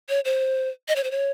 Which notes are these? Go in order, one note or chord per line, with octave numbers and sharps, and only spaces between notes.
C#5
C5
D#5
C#5
C5
C#5